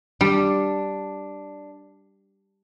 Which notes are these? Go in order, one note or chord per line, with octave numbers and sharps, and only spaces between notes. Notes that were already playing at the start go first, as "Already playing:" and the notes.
G3 D4